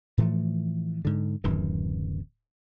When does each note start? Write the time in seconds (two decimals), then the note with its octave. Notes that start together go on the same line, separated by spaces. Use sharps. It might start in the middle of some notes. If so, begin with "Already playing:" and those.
0.18 A2 E3 F3 A3
1.05 G#2 D3
1.44 D1 F#2 D#3 E3